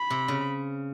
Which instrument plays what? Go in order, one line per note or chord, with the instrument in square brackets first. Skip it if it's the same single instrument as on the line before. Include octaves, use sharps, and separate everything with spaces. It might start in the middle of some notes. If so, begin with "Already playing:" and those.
Already playing: [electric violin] B5
[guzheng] C3
C#3